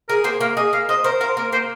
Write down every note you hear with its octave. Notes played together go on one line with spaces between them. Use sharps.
G#4 A#4
A#3 C5
A#3 F5
G#4 D#5
A#3 F5
C5 D#5
A#4 C5
A#4 F5
A#3 A#4
A#3 C5